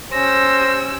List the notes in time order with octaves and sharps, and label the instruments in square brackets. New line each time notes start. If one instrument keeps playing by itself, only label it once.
[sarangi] C#4 [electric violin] G4 E6 [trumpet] C5 [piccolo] A#6